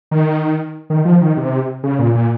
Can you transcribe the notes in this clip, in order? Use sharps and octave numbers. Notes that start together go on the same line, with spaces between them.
D#3
D#3
F3
D#3
C3
C#3
A#2
A#2